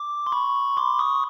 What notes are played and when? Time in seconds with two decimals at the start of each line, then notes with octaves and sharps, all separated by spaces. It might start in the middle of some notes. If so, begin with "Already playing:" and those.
Already playing: D6
0.27 C6
0.32 B5 C#6
0.77 C6 D6
0.99 C#6 D#6